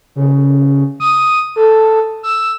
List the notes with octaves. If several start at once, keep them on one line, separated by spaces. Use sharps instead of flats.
C#3
D#6
A4
E6